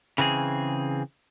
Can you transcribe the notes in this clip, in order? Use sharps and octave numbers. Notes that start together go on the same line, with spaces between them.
C#3 E3 C4 G#4